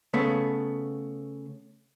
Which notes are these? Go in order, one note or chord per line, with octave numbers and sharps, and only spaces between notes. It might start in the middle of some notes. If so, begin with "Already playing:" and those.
C#3 A3 B3